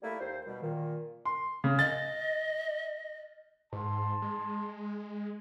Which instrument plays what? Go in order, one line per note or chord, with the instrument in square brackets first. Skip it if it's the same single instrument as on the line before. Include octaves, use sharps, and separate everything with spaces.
[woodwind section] G3 A3 A#3 E4
D#2 C5
B2 G3
A#2 D#3
[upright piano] C6
C#3
[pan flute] D#5 [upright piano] A6
[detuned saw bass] G#2 [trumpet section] A5 C6
[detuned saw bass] G#3